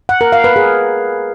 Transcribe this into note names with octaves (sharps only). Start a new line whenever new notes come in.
F#5
A#4
F5
B4
G#4